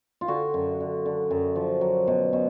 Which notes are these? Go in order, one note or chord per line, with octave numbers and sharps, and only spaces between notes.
F4
D3 F#4
F#2
D3
D3
F#2
F3
F#3
B2
B2